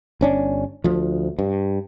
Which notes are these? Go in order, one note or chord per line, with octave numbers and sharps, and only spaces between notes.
G1 C#4 D4
D2 F3
G2